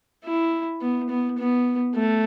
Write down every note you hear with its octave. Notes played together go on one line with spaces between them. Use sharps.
E4
B3
B3
B3
A3